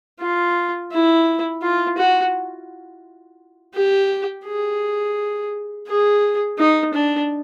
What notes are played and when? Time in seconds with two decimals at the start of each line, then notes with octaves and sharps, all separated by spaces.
0.20 F4
0.91 E4
1.62 F4
1.97 F#4
3.74 G4
4.46 G#4
5.87 G#4
6.58 D#4
6.94 D4